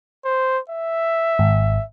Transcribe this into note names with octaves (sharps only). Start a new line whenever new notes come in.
C5
E5
G#1